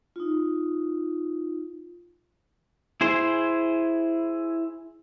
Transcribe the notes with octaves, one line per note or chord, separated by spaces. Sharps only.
D#4 F4
E4 G#4 C5